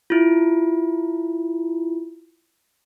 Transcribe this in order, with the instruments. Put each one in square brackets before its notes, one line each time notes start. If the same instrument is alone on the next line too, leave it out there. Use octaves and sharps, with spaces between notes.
[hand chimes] E4 F4